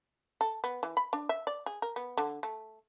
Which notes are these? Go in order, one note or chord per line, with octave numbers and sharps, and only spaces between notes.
A4
B3
E3
B5
D4
E5
D5
G#4
A#4
B3
D3
A3